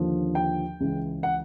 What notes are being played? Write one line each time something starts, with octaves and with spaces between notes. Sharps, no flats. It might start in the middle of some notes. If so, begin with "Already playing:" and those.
Already playing: D#2 D3 F3
G5
C#2 C#3 E3
F#5